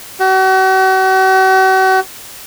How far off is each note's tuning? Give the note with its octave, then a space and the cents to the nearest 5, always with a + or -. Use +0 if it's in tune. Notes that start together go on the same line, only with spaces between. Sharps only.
F#4 +40